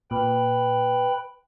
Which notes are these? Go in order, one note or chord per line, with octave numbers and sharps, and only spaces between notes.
A#2 B4 G5 B5